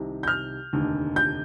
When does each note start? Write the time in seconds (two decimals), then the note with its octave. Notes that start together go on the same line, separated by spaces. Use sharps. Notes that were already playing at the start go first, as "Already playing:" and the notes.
Already playing: C2 C3 D#3
0.23 G6
0.28 F6
0.73 F1 D#2 D3
1.16 G6